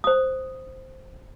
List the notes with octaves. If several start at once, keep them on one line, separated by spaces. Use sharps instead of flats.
C5 D#6